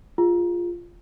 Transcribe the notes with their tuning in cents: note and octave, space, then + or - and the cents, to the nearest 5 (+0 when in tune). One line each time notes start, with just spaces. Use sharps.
F4 +0 G#4 -25